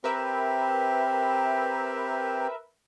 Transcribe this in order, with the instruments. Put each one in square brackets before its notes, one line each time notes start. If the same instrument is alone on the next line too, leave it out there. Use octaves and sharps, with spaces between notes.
[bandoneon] C4 G4 [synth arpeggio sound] A#4 B4 E5